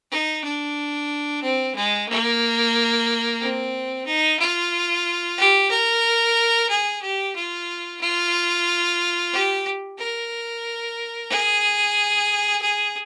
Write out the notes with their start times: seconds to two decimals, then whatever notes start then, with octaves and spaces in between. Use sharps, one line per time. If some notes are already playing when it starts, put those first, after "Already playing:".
0.11 D#4
0.44 D4
1.43 C4
1.76 G#3
2.09 A#3
3.40 C4
4.06 D#4
4.39 F4
5.38 G4
5.71 A#4
6.70 G#4
7.02 G4
7.36 F4
8.01 F4
9.33 G4
9.99 A#4
11.30 G#4
12.62 G#4